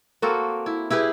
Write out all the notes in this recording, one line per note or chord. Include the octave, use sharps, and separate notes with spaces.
A#3 C4 F#4 A4
E4
E4 G4 G#4 B4